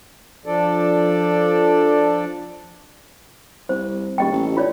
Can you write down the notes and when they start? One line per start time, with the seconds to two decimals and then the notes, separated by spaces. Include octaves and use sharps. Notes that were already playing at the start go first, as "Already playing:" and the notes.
0.46 F3 D4 A4 D5
3.69 C2 C5
4.18 D#1 G4 D#5 G5
4.32 A1
4.57 F4 C#5 D5